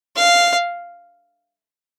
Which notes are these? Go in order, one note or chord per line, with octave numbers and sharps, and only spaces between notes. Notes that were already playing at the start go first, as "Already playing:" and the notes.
F5